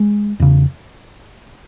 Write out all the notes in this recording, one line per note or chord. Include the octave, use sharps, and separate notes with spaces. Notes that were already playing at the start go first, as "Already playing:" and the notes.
Already playing: G#3
E2 C#3